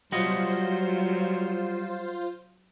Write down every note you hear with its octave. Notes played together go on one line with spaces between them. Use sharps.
F#3 G3 F4 F#4 C5 D#5